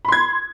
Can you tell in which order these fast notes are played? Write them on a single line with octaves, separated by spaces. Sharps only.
B5 C6 G#6